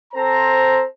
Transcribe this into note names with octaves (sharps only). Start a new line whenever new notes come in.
C4 A4 C5 A#5